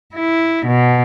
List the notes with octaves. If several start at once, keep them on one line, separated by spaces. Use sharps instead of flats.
E4
B2